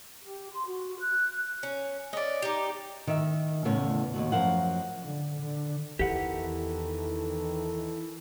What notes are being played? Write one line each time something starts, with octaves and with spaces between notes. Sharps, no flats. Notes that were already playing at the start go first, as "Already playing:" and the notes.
G4
C6
F#4
F#6
C#4
C#4 D5 D#5
D#4 G4
D#3 E5
E2 A2 C#3 B3 C#5
D#2 G#2 F#4
F#2 F3 A#4 F5 F#5
D3
D3
E2 D#3 E3 G4 A4 F#5